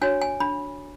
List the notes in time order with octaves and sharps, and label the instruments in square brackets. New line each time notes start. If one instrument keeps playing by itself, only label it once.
[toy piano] D4 F#4 C#5 G#5
G#5
D4 B5